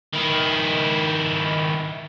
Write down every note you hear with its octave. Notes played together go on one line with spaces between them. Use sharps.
D#3 E4